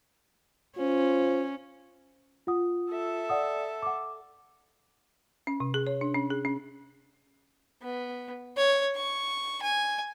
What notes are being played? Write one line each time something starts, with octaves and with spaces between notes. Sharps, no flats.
C#4 F4 C5
F4 F#5 D#6
A4 E5
D5 F#5 D#6
F#5 D6
C#4
C3
G#4
C#5
D4
C#4
G#4
C#4
B3
C#5
C#6
G#5